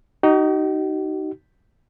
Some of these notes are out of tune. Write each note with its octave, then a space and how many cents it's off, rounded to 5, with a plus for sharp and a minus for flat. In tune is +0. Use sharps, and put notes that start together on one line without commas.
D#4 +0 F#4 +45